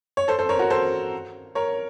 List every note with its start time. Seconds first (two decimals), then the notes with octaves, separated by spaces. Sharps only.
0.17 C#5
0.28 A4 C5
0.39 A4 C5
0.49 A#4 C#5
0.59 F#4 A#4
0.70 A4 C5
1.55 A#4 C#5